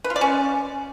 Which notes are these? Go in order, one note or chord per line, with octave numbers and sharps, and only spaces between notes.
B4
F4
D5
C#4